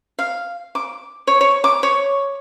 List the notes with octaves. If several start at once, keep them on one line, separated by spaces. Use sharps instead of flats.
F5
D6
C#5
C#5
D6
C#5